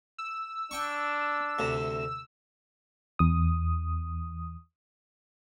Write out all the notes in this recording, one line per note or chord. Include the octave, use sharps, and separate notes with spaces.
E6
D4 G5 C#6
D2 C3
E2 D#6